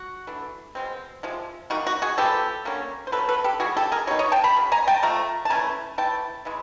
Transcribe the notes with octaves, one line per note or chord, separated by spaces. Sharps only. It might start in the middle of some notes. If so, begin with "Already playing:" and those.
Already playing: F#4
E3 A3 D4
B2 G#3 C4
C3 F3 G#3
G3 A#3 D#4 F#4
F#4
F#4 G#4
F3 G#3 B3 G4 A4
D3 G3 A#3 C#4
C5
F#3 A3 C#4 A4 B4
A4 B4
G4 A4
C#3 E3 G3 F#4 G#4
G4 A4
G#4 A#4
B2 G3 D#4 C#5
C#5 D#5
G5 A5
A5 B5
C#3 F#3
G#5 A#5
G5 A5
F3 A3 A#5
A5
E3 A3 C#4 G#5 A#5
E3 A3 G5 A5
C#3 E3 G#3